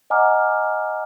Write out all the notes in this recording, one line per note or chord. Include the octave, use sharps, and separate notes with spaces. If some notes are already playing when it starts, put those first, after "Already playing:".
D#5 F#5 G#5 A#5 D6 F6